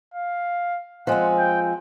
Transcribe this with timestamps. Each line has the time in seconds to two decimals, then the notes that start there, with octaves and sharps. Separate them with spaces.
0.14 F5
1.07 F3 G#3 C4 F#5
1.39 G5